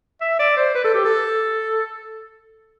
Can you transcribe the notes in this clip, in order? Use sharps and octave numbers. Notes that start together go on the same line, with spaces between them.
E5
D5
C5
B4
A4
G4
A4